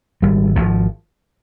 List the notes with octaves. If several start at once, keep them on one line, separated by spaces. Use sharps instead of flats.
G#1 G3
G#1 F3